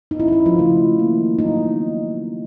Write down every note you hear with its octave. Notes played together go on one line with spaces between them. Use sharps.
D#4
D#3 G#3 C#4 E4
D#4
E4
F3 F4
C#3 F3 A3 C#4 E4
D#3 F#3 A#3 D#4
F#3 B3 D#4